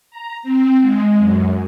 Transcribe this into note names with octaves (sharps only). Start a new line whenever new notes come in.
A#5
C4
G#3
F#2